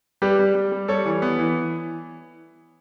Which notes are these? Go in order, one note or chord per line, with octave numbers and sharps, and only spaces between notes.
G3 G4 B4
G3
G3
G3
G3 A4 C#5
E3
B3
E3